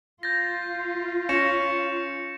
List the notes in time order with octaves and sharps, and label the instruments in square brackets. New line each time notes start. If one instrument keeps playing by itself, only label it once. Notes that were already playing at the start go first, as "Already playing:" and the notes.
[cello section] F4 [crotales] G6 A6 A#6
[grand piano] C#4 [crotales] A#6 C#7 E7